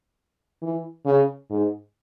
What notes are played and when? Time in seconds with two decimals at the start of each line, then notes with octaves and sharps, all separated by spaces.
0.63 E3
1.06 C#3
1.50 G#2